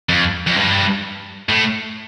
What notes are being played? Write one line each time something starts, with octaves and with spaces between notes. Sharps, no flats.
F2
F2
G2
A2